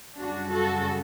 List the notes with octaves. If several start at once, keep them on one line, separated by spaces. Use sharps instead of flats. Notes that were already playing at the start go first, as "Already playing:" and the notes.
F#2 C#3 G3 D4 F#4
F#4 A4